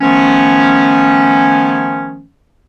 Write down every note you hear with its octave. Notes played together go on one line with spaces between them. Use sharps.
D#3 F3 A3 B3 C#4